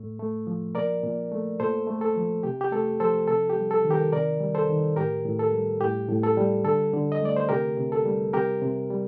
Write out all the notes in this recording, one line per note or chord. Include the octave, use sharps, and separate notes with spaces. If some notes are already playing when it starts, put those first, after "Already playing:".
Already playing: A2 A3
A3
F3
A#2 A#4 D5
A#2
A3
A#2 A4 C5
A3
A4
F3
C3 G4
G4
A3 A4
F3 A4 C5
C3 A4
G4
G3
A4
D#3
G4 A#4
C3 A#4 D5
G3
A4 C5
D#3
A2 G4 A#4
A2
A4
G3
A2 G4
A2
A4
G3
D3 A4
D3
D#5
A3 D5
C5
C3 G4 A#4
C3
A4
G3
C3 G4 A#4
C3
G3